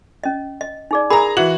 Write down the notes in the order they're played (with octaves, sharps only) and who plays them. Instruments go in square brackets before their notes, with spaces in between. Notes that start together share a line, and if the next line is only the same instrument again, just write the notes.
[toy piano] C#4 D#5
D#5
D#4 G#4 D5
[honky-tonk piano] G#4 A#5 [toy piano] A#4 B5
[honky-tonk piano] E3 F#4 F#7